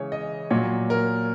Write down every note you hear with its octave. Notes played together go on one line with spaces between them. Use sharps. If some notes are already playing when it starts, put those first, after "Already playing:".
Already playing: C#3 E3 G#3 C#5
D#5
A#2 F#3 C#5
A#4